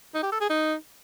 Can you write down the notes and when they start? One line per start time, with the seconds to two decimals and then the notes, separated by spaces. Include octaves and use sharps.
0.14 D#4
0.23 G4
0.32 A4
0.41 G#4
0.50 D#4